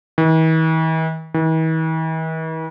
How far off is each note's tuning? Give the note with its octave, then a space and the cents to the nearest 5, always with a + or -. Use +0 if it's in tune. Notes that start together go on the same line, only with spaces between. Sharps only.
E3 -45
E3 -45